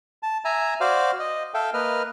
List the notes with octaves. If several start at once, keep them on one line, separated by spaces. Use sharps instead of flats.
A5
E5 G#5 A#5
F#4 C5 D5 F5
D#5
A4 E5 F5 G5
A#3 B4 D#5 F6